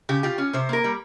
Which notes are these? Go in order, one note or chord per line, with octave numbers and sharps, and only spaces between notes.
C#3 G4
F4 G4
C#4
C3 C5
A#3 A#4
G3